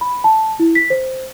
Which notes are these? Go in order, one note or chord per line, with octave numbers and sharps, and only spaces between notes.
B5
A5
E4
B6
C5